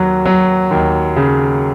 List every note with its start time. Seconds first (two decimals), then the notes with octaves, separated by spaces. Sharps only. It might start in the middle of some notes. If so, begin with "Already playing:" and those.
Already playing: D#2 F#3
0.25 F#3
0.71 D#2
1.16 C#3